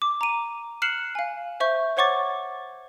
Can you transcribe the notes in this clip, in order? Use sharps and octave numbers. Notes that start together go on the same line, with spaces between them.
D6
A#5 D#7
F6 F#6 C7 C#7 E7 F#7
F5 G#5
C5 E5 C#6 G6
C5 C#5 F#5 C#6 D6 A6